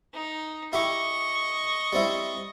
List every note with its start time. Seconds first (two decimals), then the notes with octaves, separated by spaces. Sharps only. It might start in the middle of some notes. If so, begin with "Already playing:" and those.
0.13 D#4
0.73 E4 G4 D#5 C#6
1.93 G3 C4 E4